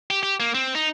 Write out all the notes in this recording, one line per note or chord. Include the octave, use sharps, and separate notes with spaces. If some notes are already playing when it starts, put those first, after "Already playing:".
G4
G4
A#3
C4
D#4